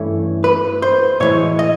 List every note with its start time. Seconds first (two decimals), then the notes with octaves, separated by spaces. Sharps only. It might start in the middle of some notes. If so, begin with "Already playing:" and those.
Already playing: G2 E3 A3 C#4 C#5
0.44 B4
0.82 C5
1.20 A2 E3 G#3 C#5
1.59 D#5